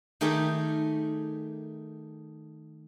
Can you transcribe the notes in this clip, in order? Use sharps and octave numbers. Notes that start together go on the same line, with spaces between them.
D#3 A3 G4 G#4 A#4 G5